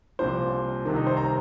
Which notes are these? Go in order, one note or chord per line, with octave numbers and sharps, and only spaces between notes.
C2 A#2 F3 C4 C5
C2 C3 D#3
D#4
C5
A#5